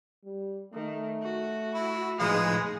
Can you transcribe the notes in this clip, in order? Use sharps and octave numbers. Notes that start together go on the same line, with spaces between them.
G3
D#3 A3
F#4
E4
A2 F3 G#3 D#4 G#4 B4 F5 D#6